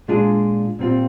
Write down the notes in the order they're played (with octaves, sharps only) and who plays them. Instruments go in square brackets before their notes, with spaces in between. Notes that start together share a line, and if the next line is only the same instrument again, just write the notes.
[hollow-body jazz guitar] A#2 G#3 D4 F4 G#4
A#2 G3 C4 F4